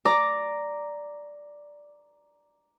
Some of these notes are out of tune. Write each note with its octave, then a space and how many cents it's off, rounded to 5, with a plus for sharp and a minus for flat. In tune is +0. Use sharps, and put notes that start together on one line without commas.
D5 +0 A#5 +0 D6 +0